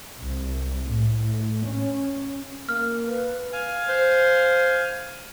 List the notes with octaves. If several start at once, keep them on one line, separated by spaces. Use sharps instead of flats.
C2
A2
C#4
A#3 F6
B4
F5 G#5
C5